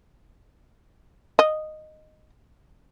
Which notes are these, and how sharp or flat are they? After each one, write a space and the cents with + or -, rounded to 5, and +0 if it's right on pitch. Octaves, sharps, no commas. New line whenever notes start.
D#5 -10